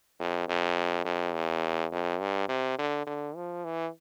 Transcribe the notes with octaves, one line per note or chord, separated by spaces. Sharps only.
F2
F2
F2
E2
F2
G2
C3
D3
D3
F3
E3